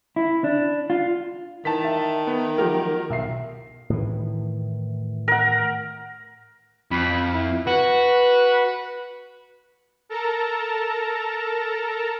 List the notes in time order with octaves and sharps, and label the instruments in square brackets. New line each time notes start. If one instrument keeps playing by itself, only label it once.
[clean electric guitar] E4
D4
F4
[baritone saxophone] D#3 [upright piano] E3 [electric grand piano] A5 B6
[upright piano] E5
[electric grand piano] B3
[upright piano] F3 F#3 G4 [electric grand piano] A#4
[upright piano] B1 E5 C7
[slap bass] A2 D#3 E3
[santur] A#4 F#5
[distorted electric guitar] F2 [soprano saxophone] B5
[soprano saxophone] E4
[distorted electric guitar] F#4 [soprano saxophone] B4
[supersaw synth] A4 A#4 A5 A#5